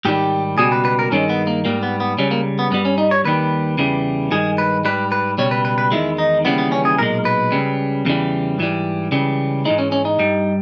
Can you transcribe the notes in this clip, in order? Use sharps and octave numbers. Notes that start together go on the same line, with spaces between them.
G#2 D#3 G3 G4
C#2 B2 G3 G#4
B4
B4
A#4
G2 D#3 G#3 C#4
B3
A#3
G#2 G3 A#3
B3
B3
C#2 C#3 G3 C#4
A#3
B3
G2 G3 B3
C#4
D#4
C#5
D#2 D#3 G3 B4
E2 C#3 E3 G3
G2 D#3 G#3 G#4
B4
G#2 G3 B4
B4
C#2 B2 G3 C#5
B4
B4
B4
E2 D#3 G#3 E4
D#4
D#2 C#3 E3 G3 B3
B3
C#4
G#4
B1 A#2 G#3 A#4
B4
C#2 C#3 G3
E2 C#3 E3 G3
G#2 E3 G3
C#2 C#3 E3 G3
G#2 E3 G#3 D#4
C#4
C#4
D#4
G2 G3